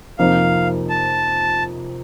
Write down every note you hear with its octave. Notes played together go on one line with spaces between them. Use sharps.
F2 C3 F3 A#3 D#4 F5
A5